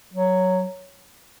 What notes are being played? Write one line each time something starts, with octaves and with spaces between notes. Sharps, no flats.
F#3